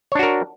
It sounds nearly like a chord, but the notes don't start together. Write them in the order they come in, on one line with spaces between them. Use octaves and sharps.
C#5 D4 F#4 A#4